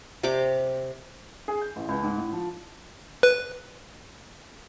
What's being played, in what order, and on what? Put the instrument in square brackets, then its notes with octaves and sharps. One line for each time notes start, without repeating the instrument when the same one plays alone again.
[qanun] C3 G4 D5 D6
[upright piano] G#4
G6
A1
C#2
G#2
A2
F3
[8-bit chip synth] B4